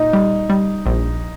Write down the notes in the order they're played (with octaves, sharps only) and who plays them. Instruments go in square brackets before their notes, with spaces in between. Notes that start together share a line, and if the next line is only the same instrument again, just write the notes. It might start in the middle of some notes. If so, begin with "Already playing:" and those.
Already playing: [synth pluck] A#2 [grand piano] D#4
[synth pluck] G3
G3
A#1